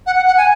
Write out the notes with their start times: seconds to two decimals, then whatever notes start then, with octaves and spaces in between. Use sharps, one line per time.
0.06 F#5
0.17 F#5
0.27 F#5
0.37 G#5